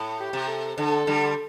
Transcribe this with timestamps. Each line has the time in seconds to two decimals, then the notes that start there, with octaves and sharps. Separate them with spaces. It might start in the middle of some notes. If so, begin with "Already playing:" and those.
Already playing: A2
0.19 G4
0.33 C3
0.48 A4
0.77 D3 A4
1.07 D3 G3